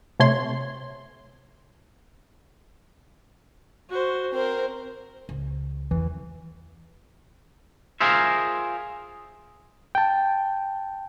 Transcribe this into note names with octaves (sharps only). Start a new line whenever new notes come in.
C3 A3 C#5 C6
F#4 C5
C4 A#4 C5
C#2
E2 E3
F4 G#4 A#4 C5 E5
G5 A5